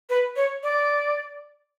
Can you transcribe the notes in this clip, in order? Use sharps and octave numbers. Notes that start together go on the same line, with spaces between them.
B4
C#5
D5